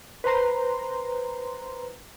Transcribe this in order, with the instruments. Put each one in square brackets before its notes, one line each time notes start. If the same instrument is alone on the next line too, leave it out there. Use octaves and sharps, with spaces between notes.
[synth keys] B4 C5 A#5 C6